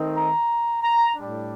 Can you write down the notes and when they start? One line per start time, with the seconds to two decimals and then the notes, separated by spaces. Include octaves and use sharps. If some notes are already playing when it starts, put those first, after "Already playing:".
Already playing: D#3 A3 C4 D#4
0.16 A#5
0.82 A#5
1.16 A2 G3 D4